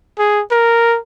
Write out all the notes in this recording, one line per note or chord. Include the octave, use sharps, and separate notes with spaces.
G#4
A#4